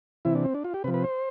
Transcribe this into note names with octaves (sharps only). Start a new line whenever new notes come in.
C3 E3 E4
D4
C4
D4
F4
G4
C3 F3 B4
B4
C5